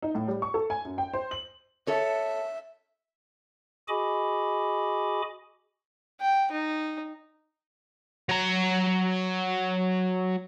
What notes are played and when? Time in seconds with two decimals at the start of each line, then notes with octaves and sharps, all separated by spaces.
0.02 D#4
0.15 A2
0.28 G3
0.42 C#6
0.54 A4
0.70 G#5
0.85 F#2
0.98 G5
1.13 C5
1.31 F#7
1.87 A4 C#5 E5
3.88 F#4 G#4 D#5 G#5 B5 D6
6.21 G5
6.51 D#4
8.29 F#3 A#5